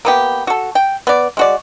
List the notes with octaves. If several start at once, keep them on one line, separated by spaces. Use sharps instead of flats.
A#3 B3 G4
F#4 A4
G5
B3 D5
G#3 F#4 D5